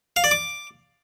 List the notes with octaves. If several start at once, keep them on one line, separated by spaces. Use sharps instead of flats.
F5
D5
D6